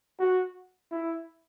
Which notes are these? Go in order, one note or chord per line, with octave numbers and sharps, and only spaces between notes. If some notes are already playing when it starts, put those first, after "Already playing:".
F#4
E4